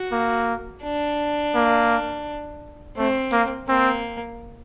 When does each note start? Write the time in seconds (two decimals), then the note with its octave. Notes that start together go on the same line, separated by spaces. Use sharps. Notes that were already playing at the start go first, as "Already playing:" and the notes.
Already playing: F#4
0.12 A#3
0.83 D4
1.55 A#3
2.97 A3 C4
3.32 A#3
3.68 A#3 C4